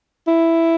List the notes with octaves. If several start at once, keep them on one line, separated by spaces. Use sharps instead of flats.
E4